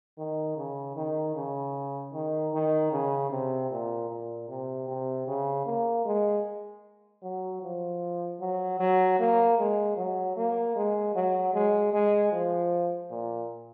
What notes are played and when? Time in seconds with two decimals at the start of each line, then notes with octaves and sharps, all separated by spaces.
0.18 D#3
0.57 C#3
0.96 D#3
1.35 C#3
2.14 D#3
2.53 D#3
2.92 C#3
3.31 C3
3.70 A#2
4.10 A#2
4.49 C3
4.88 C3
5.27 C#3
5.66 A#3
6.05 G#3
7.23 F#3
7.62 F3
8.40 F#3
8.80 F#3
9.19 A#3
9.58 G#3
9.97 F#3
10.37 A#3
10.76 G#3
11.15 F#3
11.54 G#3
11.93 G#3
12.32 F3
13.11 A#2